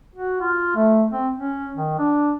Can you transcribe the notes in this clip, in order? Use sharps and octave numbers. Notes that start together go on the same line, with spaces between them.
F#4
F4
A3
C4
C#4
D#3
D4